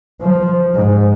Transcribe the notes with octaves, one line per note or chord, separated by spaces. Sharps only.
F3
G#2